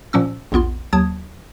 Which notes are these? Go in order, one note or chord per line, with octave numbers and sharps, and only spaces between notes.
A#2 F3 C#4 E6
A#1 E2 B3 F4 C6
D#2 F#3 A5 D#6 G#6